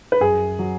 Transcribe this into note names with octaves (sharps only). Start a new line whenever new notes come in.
B4
F#2 G#4
F#3